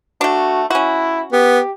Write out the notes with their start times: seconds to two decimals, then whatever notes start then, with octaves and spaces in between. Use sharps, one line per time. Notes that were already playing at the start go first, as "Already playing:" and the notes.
0.21 A3 D4 F#4
0.70 C#4 E4 F#4
1.33 B3 G4